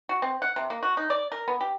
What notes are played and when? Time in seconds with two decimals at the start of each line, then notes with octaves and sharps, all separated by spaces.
0.09 F#4
0.22 C4
0.42 F#5
0.56 C3
0.70 A#3
0.83 F#4
0.97 D#4
1.10 D5
1.32 A#4
1.48 B3
1.61 G4